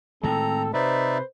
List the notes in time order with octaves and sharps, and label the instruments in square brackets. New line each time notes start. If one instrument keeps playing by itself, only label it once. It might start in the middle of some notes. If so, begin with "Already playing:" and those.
[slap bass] A2 D#3 G#3 [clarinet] C4 [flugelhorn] A4 [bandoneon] A#5
[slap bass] C3 [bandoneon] D#4 D5 E5 [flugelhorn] B4 [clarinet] C5